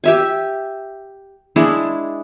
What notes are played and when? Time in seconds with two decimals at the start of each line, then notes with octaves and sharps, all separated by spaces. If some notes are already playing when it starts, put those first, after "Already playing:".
0.04 G4 E5 G#5
1.56 G#3 D4 E4 G#4